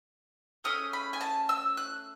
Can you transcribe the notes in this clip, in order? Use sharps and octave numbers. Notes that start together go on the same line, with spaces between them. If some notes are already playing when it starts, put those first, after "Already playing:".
A3 C#4 G#4 D#6
B5
G#5
A5
E6
F#6